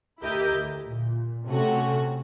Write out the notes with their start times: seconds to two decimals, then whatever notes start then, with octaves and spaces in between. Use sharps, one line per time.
0.22 D2 E4 G4 A#4 D#5 G6
0.54 D2
0.90 A#2
1.46 C3 A3 C#4 F#4